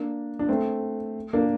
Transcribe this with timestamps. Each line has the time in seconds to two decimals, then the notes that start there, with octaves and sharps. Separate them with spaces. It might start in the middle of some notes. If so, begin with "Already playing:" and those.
Already playing: A#3 D4
0.39 D4
0.49 A3 C4
1.33 A#3 D4